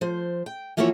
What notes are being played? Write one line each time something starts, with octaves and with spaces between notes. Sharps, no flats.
F3 C5
G5
E3 F3 A#3 E4 F#4 C#5